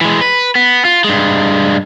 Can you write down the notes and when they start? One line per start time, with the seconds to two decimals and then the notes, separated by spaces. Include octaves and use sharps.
0.01 E3 G#3
0.21 B4
0.56 B3
0.85 F4
1.04 G2 G#3